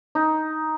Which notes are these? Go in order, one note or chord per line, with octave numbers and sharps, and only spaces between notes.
D#4